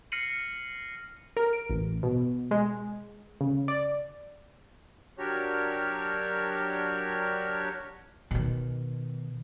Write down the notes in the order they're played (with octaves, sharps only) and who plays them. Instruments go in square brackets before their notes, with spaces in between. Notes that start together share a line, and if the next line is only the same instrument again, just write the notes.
[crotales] F6 A#6 C7 C#7 D#7 F#7
[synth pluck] A#4
D7
A1
B2
G#3
C#3
D5
[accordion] F#3 D4 F#4 G4 A#4 C#5
[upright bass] B2 D#3